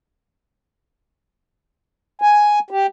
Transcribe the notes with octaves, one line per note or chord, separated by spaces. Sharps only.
G#5
G4